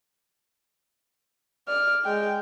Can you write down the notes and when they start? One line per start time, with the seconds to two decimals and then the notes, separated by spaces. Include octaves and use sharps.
1.68 D5 F6
2.05 G#3 G5